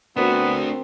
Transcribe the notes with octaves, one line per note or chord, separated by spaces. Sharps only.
A3 B3 C4 D4 F#4 A#4